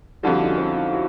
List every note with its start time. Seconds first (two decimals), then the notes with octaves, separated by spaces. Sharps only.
0.23 F2 D3 G3 E4 F#4
0.41 D#4 F4
0.50 C#4
0.58 C4
0.75 D#4 F4
0.92 E4 F#4